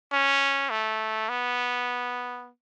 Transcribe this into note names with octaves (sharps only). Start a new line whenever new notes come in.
C#4
A3
B3